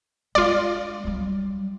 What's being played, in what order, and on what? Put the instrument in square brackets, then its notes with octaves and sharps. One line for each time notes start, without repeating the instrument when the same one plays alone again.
[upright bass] G#3 D4 [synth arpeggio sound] F4 D5
[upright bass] F#3 G3